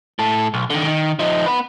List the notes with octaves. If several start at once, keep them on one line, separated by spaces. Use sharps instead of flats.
A2 A4
B1
D3 D#3
D#3
F3 D#4
B3 B4